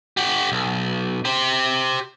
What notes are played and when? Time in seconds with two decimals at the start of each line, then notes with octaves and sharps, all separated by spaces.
0.17 G4 F#5
0.52 B1
1.25 G4 C5